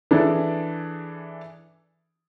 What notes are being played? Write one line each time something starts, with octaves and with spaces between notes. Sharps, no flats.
E3 D4 G#4 A4